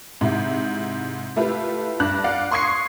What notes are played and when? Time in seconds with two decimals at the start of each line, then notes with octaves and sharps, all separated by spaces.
0.21 G#2 C3 E4
1.36 A3 E4 F4 G4 B4
2.00 G2 D4 F#6
2.24 D5 F5 F#5
2.51 C6 C#6 D#6 G#6 C7 C#7